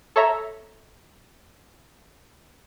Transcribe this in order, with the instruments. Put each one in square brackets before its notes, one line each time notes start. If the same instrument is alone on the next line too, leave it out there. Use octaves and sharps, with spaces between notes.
[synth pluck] A4 C#5 E5 A#5